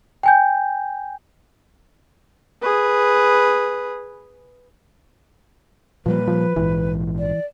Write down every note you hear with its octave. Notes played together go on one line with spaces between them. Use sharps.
G5 G#5 G6
G#4 B4
A#2 F3 G3 A#3 B4
F3
A#1 G#2 E3
D5